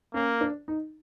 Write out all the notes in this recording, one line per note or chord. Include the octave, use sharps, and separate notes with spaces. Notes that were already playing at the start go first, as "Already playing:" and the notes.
A#3 C#4
D4
D#4